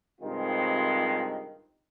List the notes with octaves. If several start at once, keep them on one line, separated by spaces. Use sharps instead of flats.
G2 C3 D#3 G#3 C4 F4